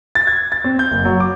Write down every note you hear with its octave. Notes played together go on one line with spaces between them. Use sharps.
A6
G#6
A6
C4
G6
F#1
F#3
D6